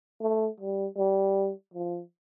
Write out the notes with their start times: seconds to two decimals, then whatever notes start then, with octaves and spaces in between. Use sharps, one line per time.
0.21 A3
0.60 G3
0.97 G3
1.74 F3